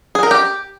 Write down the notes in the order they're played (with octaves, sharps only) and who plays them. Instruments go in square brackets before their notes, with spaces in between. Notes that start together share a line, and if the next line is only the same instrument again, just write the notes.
[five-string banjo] G#4
A#4
G4